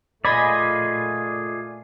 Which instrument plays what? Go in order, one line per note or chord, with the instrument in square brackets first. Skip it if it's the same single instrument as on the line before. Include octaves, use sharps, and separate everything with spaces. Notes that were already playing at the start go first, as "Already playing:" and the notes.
[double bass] A#2 A3 [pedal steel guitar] F4 G#4 D5 [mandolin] D#5 G#5 B5